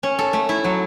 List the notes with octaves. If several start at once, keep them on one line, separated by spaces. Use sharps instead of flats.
C#4
A4
A3
E4
F#3